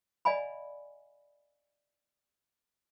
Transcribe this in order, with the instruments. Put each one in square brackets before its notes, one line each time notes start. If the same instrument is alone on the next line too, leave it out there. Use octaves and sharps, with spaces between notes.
[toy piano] D5 D#5 F5 G#5 B5